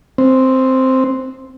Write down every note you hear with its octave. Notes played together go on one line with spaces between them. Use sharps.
C4